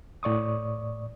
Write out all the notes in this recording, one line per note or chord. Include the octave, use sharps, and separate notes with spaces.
A2 D5 C#6 D#6